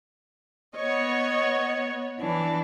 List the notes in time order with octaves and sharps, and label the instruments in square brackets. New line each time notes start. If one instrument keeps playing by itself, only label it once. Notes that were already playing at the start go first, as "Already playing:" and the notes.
[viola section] B3 C#5 [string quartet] D#5
[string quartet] E3 D4